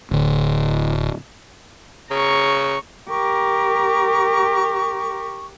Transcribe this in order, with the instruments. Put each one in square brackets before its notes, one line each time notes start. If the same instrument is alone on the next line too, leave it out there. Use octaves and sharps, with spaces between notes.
[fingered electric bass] D1 D2
[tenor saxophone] C#3 [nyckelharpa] A#5 C#6
[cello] G4 A#4 [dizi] C#6